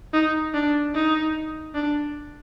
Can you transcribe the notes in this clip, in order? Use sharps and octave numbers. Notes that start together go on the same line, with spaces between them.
D#4
D4
D#4
D4